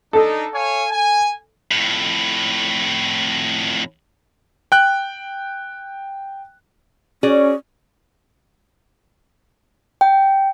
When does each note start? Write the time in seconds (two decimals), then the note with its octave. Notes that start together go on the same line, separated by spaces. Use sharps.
0.13 D4 D#4 A4
0.53 C#5 F5 G#5
0.91 G#5
1.71 F2 A2
4.72 G5 F#6
7.23 C#4 F#4 G#4 D5
10.01 G5